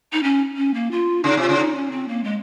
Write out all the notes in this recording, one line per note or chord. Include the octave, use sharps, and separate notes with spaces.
D#4
C#4
C#4
A#3
F4
C#3 D#4
C3 F4
C#3
D#4
C#4
C4
A#3
G#3